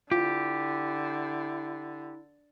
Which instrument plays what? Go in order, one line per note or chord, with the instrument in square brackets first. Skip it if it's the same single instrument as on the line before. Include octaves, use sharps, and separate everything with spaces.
[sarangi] D3 [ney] E4 [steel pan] F4 [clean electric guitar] G4